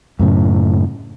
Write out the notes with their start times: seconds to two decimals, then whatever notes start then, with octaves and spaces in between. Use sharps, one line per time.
0.19 F#2 A2 C#3